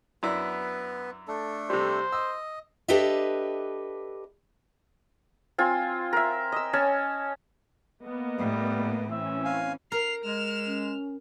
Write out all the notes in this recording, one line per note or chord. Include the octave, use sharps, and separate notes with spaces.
F#2 B3 D4 E4 B4
A3 D4 A4
C3 G3 C5
D#5 E6
D4 G4 A4 B4 D#5 E5
C4 F4 G#5
A#4 E5
D#5 E6
C#4 G#5 A5
A#3 B3 D#5
A2 G3
E3 C4 C#4 E5
F5 G#5
A#4 C7 F7
G#3 F6 E7
C#4